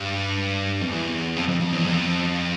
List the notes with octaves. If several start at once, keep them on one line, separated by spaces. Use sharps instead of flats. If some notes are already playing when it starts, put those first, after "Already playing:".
Already playing: G2
F2
E2
F2
F2
F2
E2
F2